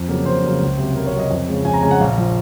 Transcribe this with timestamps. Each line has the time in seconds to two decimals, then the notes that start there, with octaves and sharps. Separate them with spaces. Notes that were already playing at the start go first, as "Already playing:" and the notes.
Already playing: F2
0.08 C#3 F#3 A#3
0.26 F2 C5
0.43 C#3 F#3 A#3
0.61 C#2
0.78 C3 F#3
0.95 C#2 A#4
1.07 C#5
1.13 C3 F#3
1.19 D#5
1.30 F2
1.48 C#3 G#3
1.65 F2 G#5
1.74 A#5
1.82 C#3 G#3 G#5
1.91 F#5
2.00 A#1 F5
2.18 F3